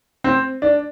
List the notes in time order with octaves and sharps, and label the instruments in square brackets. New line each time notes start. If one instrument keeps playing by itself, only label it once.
[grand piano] C4
D4